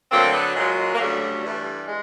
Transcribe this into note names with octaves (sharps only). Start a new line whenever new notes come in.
D2 D3 F#3 A#3 C4
A3 B3
A#2 F#3 G#3
G#3
A#3
D2 C#3 F#3 G3 A3
G2 E3 G3
G#3